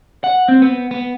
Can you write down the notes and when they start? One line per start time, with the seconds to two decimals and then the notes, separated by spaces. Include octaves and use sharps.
0.24 F#5
0.49 C4
0.62 B3
0.91 B3